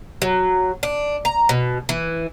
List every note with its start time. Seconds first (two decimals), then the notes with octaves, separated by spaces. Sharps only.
0.22 F#3
0.83 D4
1.25 A#5
1.49 B2
1.89 E3